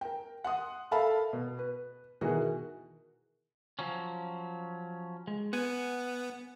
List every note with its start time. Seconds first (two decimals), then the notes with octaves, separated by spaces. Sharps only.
0.01 A#4 G5
0.44 F#5 C6 D#6
0.91 A4 A#4 E5 F5 A5 B5
1.33 B2
1.59 B4
2.21 B2 D#3 E3 F#4 G#4 A#4
3.79 F3 F#3 C#4
5.27 G#3
5.53 B3 F#5 G#5